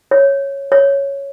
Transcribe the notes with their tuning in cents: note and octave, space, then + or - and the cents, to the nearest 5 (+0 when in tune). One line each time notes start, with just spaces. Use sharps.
C#5 -5
C#5 +0